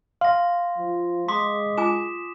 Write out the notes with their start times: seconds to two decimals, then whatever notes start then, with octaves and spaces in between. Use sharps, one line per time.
0.21 F5 C6 A#6
0.78 F3
1.28 G#3 C6 D6 D#6 B6
1.78 F4 G#5 D6 E7